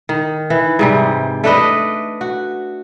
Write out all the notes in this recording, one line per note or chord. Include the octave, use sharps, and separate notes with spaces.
D#3
E3
G#2 C3 G3
A3 D4 B4 D#5
F#4